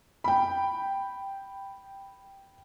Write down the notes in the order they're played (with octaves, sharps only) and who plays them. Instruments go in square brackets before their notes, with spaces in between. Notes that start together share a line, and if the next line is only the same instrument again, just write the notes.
[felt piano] G5 B5